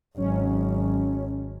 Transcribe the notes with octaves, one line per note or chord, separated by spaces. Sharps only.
G#1 F#3 C#4